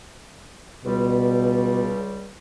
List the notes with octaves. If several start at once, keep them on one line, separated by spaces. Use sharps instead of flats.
C#2 B2 G3